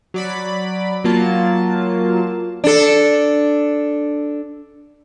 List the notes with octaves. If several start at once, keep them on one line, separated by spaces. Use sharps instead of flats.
F#3 D5 B5
F#3 A#3 F4 A5
D4 A4